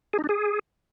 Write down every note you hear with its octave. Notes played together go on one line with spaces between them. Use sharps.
G#4
D#4
D4
G#4